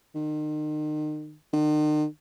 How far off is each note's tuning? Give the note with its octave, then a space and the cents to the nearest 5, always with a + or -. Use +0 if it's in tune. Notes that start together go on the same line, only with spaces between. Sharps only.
D#3 -35
D#3 -45